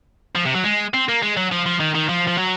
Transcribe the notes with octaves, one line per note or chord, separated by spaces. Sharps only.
F3
C3
F#3
G#3
C4
A#3
G#3
F#3
F3
F3
D#3
D#3
F3
F3
F#3